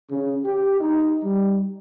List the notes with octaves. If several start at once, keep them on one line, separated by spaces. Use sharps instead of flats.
C#3
G4
D#4
G3